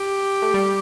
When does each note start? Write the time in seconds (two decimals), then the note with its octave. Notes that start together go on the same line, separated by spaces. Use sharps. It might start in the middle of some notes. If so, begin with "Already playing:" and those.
Already playing: G4
0.42 A3
0.54 G3